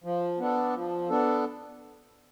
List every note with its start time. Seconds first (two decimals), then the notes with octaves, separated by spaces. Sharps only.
0.04 F3
0.39 B3 D4 A4
0.74 F3
1.10 B3 D4 A4